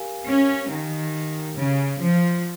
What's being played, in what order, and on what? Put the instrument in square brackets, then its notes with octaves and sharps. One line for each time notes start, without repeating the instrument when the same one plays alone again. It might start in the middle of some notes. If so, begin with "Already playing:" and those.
Already playing: [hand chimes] G4 A#4 F5 G#5
[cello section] C#4
D#3
C#3
F3